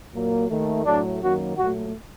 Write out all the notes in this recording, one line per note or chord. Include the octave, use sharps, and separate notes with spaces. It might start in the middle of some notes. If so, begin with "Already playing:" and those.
A#2 F#3 A#3
D#2 D#3 A3
A2 F#3 A3 D4
F#2 D#3 F#3 A#3 F#4
A#2 F#3 A3 F#4